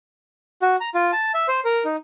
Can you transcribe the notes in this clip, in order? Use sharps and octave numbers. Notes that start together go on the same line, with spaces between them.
F#4
A#5
F4
A5
E5
C5
A#4
D#4